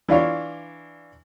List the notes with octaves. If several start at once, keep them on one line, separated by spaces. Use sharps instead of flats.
E3 D4 F4 C#5